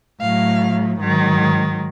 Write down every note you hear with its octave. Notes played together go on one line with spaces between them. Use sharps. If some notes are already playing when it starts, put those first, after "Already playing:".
A2 F#3 F5
G#2 D#3 F#3